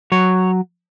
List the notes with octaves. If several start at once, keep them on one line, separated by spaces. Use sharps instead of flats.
F#3 C#5